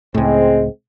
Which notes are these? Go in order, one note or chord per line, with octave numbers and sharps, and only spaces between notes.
C#2 A2 G#3 C4